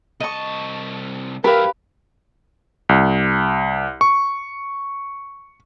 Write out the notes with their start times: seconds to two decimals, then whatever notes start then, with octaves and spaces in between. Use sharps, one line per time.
0.20 C2 D#5 A5 C#6
1.44 G2 E4 G4 A#4 B4 F5
2.89 C2
4.01 C#6